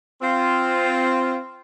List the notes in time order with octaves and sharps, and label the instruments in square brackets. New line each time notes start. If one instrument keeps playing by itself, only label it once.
[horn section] C4 F4